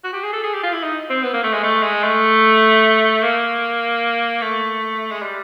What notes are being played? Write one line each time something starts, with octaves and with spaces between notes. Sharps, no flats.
F#4
G4
G#4
A4
G#4
G4
F4
E4
D#4
C4
B3
A#3
A3
G#3
A3
G#3
A3
A#3
A3
G#3
G3